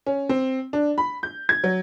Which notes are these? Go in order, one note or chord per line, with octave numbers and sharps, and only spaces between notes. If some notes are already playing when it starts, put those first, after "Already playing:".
C#4
C4
D4
B5
G6
G#6
F#3